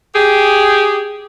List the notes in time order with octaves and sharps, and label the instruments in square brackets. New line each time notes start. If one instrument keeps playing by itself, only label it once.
[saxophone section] G4 G#4